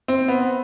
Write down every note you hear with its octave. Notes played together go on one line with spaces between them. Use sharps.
C4
B3